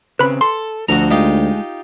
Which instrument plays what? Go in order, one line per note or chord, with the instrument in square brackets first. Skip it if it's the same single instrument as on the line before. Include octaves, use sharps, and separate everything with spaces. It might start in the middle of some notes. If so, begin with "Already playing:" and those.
[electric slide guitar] C#3 C4 [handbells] B4 B5
[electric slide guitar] A4 [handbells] C6
[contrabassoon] D2 [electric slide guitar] F3 A4 [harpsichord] F#4 A#5
[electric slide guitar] G#3 [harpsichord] D#4 F4 G4